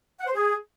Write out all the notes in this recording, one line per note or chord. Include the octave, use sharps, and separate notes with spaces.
F#5
C5
G#4